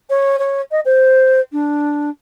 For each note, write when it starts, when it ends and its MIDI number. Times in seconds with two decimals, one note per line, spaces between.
0.09 0.36 73
0.39 0.61 73
0.71 0.80 75
0.85 1.40 72
1.52 2.09 62